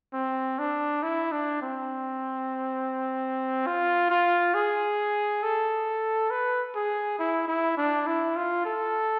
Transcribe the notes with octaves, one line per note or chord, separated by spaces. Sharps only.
C4
D4
E4
D4
C4
F4
F4
G#4
A4
B4
G#4
E4
E4
D4
E4
F4
A4